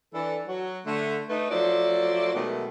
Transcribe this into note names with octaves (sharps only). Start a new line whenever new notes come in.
E3 D4 A4
F#3 F#4
D3 A3
A3 D#4 B4
F3 F#3 A3 C5 D5
B2 D#3 F#3 G#3 A3 B3